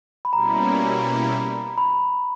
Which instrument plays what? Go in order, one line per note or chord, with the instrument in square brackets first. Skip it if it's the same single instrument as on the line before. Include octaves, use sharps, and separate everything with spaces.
[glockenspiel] B5
[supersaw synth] B2 G3 A#3 C#4 E4 [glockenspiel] A#5
[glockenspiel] B5